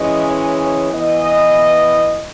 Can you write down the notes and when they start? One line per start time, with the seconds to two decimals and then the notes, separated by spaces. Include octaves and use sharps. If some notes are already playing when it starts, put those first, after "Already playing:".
Already playing: E3 G#3 C#4 D#5
0.26 C#5
0.59 C#5
0.92 E3 B3 D#5